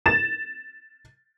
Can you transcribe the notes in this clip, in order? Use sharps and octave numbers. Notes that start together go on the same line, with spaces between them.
A6 E7